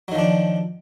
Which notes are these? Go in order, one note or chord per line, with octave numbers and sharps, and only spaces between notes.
D#3 F3 F#3 D4